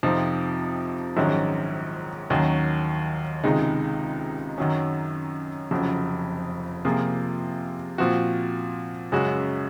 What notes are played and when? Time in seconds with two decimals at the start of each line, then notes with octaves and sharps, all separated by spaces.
0.03 F2 C3 F3 C4 D#4
1.17 A#1 G#2 D#3 F#3 C#4
2.30 D#2 D#3 F#3 C#4 F#4
3.44 C#2 C3 D#3 G#3 D#4
4.58 F#2 D#3 F#3 C#4
5.71 F1 F2 C#3 F#3
6.85 C3 F3 A#3 F4 G#4
7.98 A#2 F3 C4 F#4
9.12 F#2 C#3 G#3 C#4 F#4